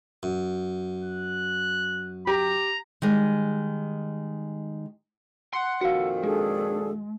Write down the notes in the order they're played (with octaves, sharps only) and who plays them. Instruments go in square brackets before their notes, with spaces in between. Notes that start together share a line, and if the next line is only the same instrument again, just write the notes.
[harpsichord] F#2
[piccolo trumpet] F#6
[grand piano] G4 [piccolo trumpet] A#5
[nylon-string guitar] D#3 G3 G#3
[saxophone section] F#5 [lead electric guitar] C6
[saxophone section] F2 A#2 D#3 [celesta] F#4 F5 [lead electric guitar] A4 F#5
[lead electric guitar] G#3 [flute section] D4 G#4 A4